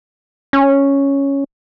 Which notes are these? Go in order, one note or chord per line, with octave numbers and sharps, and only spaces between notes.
C#4